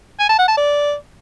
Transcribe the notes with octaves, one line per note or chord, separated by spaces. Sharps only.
G#5
A5
F#5
A5
D5